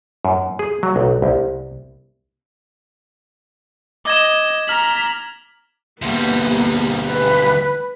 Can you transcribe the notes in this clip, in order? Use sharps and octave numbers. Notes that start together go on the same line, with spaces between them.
F#2
G#4
F#3
B1
C2
D#5 D6 G#6 E7
A#5 F6 B6 F#7
D2 G3 A#3 B3
B4